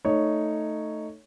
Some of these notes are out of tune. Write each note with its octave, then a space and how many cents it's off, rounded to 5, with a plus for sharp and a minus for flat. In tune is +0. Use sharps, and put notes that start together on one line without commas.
A3 +10 D#4 -5 C#5 +0